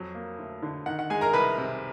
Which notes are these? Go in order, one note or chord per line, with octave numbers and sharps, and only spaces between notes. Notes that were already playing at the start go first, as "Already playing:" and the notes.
Already playing: F2 F#3
A#3
D2
D3
D#3 F#5
F#5
G#3 G#4 G#5
A#4 A#5
C2 B4 B5
C3